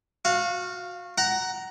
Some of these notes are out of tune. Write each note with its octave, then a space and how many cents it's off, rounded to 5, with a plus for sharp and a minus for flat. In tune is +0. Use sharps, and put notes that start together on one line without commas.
F#4 -25 F5 +0
F#5 +20 A#5 +0